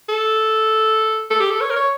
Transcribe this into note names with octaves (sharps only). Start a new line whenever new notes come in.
A4
A4
G4
A4
C#5
A#4
C#5